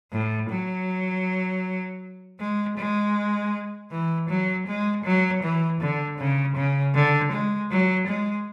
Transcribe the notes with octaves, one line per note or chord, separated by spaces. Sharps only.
A2
F#3
G#3
G#3
E3
F#3
G#3
F#3
E3
D3
C#3
C#3
D3
G#3
F#3
G#3